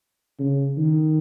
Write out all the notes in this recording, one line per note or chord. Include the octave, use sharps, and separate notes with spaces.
C#3
D#3